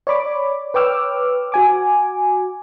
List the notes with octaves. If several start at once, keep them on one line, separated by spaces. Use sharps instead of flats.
C#5 D5 B5 D6
B4 C#5 G5 D6 E6 F6
F#4 G#5 D6